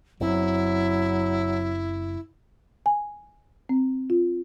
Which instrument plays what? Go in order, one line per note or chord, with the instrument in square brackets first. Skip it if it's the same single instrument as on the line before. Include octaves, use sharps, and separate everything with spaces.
[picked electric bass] F#1 F#2 C4 [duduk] F#3 [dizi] E4
[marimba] G#5
C4
F4